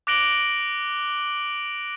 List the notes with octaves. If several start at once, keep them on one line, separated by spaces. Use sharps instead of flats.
D6 F#6 A#6 D7 F#7 G7